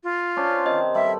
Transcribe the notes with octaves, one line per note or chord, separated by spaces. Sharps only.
F4
C#4 D4 C5
C3 D#3 D#5
G2 A4 E5 B5